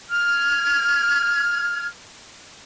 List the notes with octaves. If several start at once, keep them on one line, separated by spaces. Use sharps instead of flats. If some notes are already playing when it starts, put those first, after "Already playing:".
F6 G#6